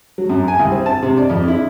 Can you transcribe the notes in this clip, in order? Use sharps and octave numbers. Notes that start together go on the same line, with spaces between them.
F#3
F#2
G#5
C2
C4
A5
C3
D5
F2
E4